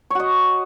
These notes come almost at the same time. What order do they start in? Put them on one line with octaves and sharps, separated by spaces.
C#5 F#4 D#5